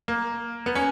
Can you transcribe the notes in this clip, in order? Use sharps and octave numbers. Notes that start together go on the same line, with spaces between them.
A#3
B3
C#4